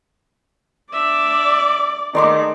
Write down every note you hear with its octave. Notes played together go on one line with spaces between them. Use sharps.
D4 D5 E5
D#3 G#3 A3 D5 C6 D6